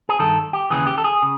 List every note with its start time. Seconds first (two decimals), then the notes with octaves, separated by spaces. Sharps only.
0.09 G#4
0.19 G2 D#3 A4
0.53 G4
0.70 D#2 C#3 E3 G#4
0.87 G4
0.98 A4
1.04 G#4
1.22 C#3